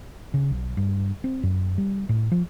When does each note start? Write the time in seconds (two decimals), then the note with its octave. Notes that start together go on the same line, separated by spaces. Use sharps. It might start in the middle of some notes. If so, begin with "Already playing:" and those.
0.34 C#3
0.50 B1
0.77 G2
1.24 C4
1.43 F#2
1.78 G3
2.09 A2
2.32 F3